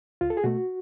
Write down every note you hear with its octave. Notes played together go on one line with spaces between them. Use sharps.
C#2 F4
A4
G#4
B2 A3 F#4